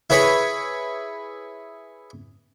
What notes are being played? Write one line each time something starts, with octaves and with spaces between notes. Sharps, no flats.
E4 G#4 B4 C#5